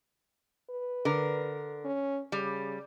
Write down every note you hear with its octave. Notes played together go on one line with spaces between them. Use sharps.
B4
D3 A#4
C#4
C#3 G3